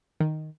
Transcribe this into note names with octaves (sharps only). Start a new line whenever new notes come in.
D#3